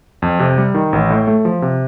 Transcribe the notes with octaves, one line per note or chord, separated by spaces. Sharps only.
F2
C3
G3
D#3
A1
A2
A3
F3
C3